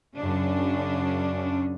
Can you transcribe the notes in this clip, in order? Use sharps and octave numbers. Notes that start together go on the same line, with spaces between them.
F#2 C#3 C#4 D4